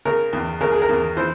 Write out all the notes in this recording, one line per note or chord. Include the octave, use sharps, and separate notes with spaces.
C#3 A#4
E2
C#3 A#4
G#4
A#4
E2
E3 C5